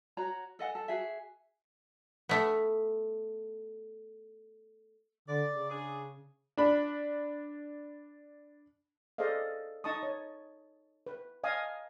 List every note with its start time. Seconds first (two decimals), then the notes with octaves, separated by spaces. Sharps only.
0.17 F#4 C#5 A#5
0.59 A4 D#5 F#5 G#5
0.75 A4
0.88 F#4 G#4 E5
2.29 A3 B3
5.28 D3 D5
5.48 C#3
5.69 D4 G#4
6.57 D4 B5
9.18 G#4 A4 C5 D5 D#5 F5
9.84 D#4 D#5 A5 C#6 D#6
10.03 C#5
11.06 B4
11.44 D#5 F5 G#5 A5 D#6